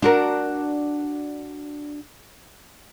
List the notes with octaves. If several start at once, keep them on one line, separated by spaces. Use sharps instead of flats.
D4 F#4 A#4